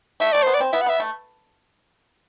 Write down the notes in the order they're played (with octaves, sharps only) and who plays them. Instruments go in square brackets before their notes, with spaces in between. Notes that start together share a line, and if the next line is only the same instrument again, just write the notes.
[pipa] A3 [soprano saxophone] E5
[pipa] A3 [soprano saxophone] D5
[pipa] B3 [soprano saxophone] C5
[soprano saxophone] D5
[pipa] C4
[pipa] B3 [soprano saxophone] E5
[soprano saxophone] F#5
[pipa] B3 [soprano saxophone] E5
[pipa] A3